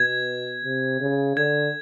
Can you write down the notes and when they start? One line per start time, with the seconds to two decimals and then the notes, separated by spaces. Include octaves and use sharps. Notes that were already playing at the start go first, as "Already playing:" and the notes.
Already playing: B2 G#6
0.65 C3
1.00 C#3
1.37 D3 G#6